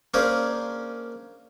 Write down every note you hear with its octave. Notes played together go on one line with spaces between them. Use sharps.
A#3 C#4 D4 G#4 A#4 C5